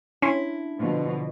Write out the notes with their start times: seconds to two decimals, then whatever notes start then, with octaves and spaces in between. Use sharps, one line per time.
0.22 C#4 D4 E4 C6
0.79 B2 D3 F3